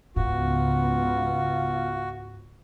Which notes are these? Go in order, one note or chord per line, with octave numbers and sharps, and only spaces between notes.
C#2 G#2 B3 F4 F#4